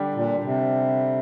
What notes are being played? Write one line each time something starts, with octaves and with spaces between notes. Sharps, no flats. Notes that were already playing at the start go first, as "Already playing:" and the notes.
Already playing: D3 G3 D4 G4
A#2
C3